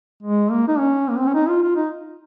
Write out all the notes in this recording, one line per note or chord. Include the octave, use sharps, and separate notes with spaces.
G#3
A#3
D#4
C#4
A#3
C4
C#4
D#4
F4
F4
D#4